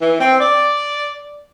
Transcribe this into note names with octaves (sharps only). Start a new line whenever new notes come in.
E3
C4
D5